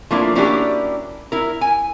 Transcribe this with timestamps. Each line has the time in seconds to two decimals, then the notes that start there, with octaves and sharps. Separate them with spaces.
0.11 F3 A3 A#3 D4 E4
0.35 A#3 C#4 D4 E4 F#4 G4
1.32 E4 A#4
1.61 G#5